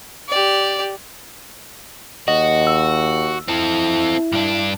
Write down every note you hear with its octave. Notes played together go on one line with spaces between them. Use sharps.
G4 D5
D#2 F#4 D#5
E6
C4 E4 A4
G2 D4